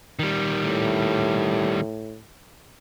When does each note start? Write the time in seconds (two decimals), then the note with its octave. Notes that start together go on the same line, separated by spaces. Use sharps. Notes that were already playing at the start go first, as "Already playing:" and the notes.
0.19 D#3 G3
0.62 A2